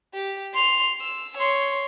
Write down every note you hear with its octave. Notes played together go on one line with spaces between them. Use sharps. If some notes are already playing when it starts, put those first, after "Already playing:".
G4
C6 F7
E6
C#5 C6